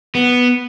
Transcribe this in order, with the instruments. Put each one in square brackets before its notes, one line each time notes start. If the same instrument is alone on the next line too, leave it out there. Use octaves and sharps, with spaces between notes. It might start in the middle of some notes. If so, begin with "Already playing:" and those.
[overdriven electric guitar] B3